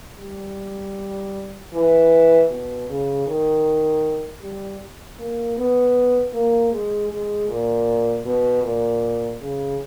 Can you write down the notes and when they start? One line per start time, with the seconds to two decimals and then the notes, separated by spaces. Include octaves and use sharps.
0.19 G3
1.73 E3
2.50 B2
2.89 C#3
3.27 D#3
4.41 G3
5.19 A#3
5.57 B3
6.33 A#3
6.72 G#3
7.10 G#3
7.48 A#2
8.25 B2
8.64 A#2
9.41 C#3